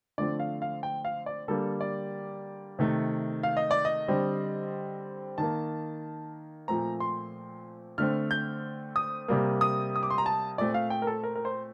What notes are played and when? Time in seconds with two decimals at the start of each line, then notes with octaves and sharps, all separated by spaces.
0.18 D3 F3 A3 C4 D5
0.40 F5
0.62 F5
0.83 G5
1.05 F5
1.26 D5
1.48 D3 G3 A#3 A4
1.81 D5
2.79 C3 D#3 A3
3.43 F5
3.57 D#5
3.71 D5
3.85 D#5
4.08 D3 G3 C4
5.38 D#3 A#3 A5
6.68 A#2 F3 A3 C4 A#5
7.00 C6
7.98 D3 A3 C4 F6
8.31 G6
8.96 D#6
9.28 C3 G3 A#3
9.61 D#6
9.96 D#6
10.03 D6
10.10 C6
10.18 A#5
10.26 A5
10.58 A#2 A3 C4 D5
10.74 F5
10.90 G5
11.02 A#4
11.07 A4
11.24 A#4
11.36 A#4
11.45 C5